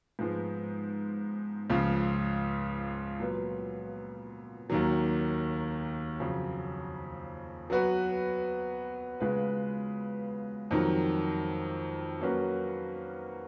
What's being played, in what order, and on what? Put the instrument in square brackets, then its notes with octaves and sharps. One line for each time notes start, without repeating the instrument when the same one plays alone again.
[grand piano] G#2 F3 G#3 B3
C#2 C#3 F3
A#2 F#3 B3
D#2 D#3 F#3
F2 C#3 F#3
F#3 B3 F#4 B4
C#3 G#3 B3 F4 B4
F2 D#3 F#3
F#3 A#3 C#4 F#4 B4